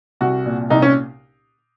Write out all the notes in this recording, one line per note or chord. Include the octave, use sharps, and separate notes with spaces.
C2 F#4
A#2
C2 D#4
C#4